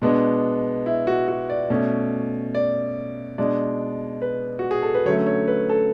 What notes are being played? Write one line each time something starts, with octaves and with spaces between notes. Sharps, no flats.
B2 G#3 B3 D4
E4
F#4
F#4
D5
B2 A3 C#4
D5
B2 G#3 D4 D5
B4
F#4
G#4
A4
B4
D3 F#3 A3 C#4 C#5
C#5
B4
A4